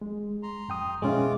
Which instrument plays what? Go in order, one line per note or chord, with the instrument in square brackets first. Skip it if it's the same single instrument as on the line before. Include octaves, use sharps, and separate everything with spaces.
[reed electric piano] G#3
[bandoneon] A#5 C6
[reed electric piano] F#2 G5 D#6
[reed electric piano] F#2 B2 C#4 [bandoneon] E3 F4 D6 [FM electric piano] G#3